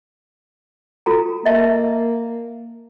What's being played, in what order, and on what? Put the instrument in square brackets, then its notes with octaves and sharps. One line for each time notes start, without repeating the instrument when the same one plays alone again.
[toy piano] F4 A4 A#5
[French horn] A#3 [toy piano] D#5 E5 A5